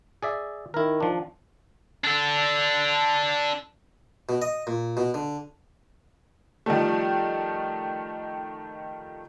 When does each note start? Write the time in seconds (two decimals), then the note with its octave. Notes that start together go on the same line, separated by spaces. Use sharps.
0.23 G#4 D5 E5
0.74 D#3 E4 A#4
1.00 F3 D4
2.04 D4 A4
4.29 B2
4.42 D#5
4.67 A#2
4.97 B2
5.14 D3
6.66 D#3 F3 G3 A3